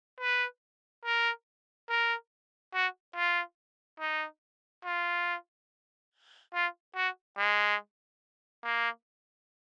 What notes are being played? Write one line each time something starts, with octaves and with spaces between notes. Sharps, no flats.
B4
A#4
A#4
F#4
F4
D#4
F4
F4
F#4
G#3
A#3